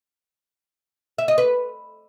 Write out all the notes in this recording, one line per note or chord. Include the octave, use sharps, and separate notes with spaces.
E5
D#5
B4